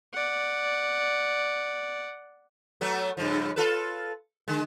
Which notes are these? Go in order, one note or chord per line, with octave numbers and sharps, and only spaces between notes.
D5 F#5
F#3 A3 B3
G2 C#3 F3
F4 A4 B4
D3 G#3